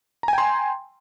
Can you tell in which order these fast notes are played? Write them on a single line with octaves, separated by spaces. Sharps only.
A#5 G#5 G5 C6